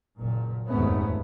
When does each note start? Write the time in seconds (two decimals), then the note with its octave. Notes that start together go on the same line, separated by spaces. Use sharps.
0.19 F#1 A#2
0.68 F1 D#2 G#2 A3 B3 C#4